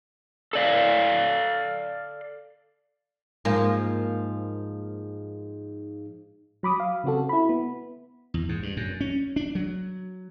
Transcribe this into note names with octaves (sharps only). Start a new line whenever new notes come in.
A4 D5 F5
G#2 F3 A#3
F#3 B5 D6 D#6
F5
C#3 C4 F#4 A4
E4 B5
B3
E2
G#2
G2
F#2
C#4
D4
F#3